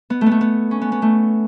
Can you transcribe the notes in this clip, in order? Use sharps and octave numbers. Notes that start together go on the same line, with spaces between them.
B3
A3
B3
A3
B3
C#4
B3
B3
A3